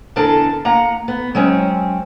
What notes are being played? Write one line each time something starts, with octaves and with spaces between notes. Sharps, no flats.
E2 D3 D4 A4 A#4 A5
A#3 F#5 A#5
B3
F#3 G#3 C4 C#4